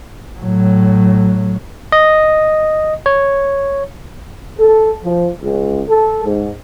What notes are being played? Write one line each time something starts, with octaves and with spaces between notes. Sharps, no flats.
A2 F#3
D#5
C#5
A4
F3
C#2
A4
G#2